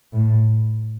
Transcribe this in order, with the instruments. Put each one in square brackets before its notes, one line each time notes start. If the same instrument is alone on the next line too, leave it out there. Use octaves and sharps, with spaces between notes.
[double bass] A2